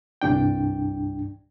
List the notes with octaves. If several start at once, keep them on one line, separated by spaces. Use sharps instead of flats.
C2 G2 D4 G5